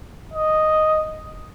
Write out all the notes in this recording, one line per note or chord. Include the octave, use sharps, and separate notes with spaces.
D#5